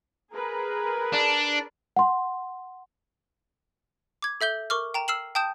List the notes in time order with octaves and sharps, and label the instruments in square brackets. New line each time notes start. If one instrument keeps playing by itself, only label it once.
[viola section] G#4 A#4 B4
[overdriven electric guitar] D4
[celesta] F#5 C6
[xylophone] D6 G#6
A4 E5 G6 G7
A#4 C#6 D6 F6
G5 A#5 E7
E6 F6 C7 E7 F#7
G5 A5 D#6 G6 E7